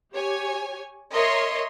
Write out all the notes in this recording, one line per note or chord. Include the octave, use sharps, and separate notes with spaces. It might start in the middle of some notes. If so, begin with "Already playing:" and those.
G4 C#5 G#5
A#4 C#5 D#5 E5 C6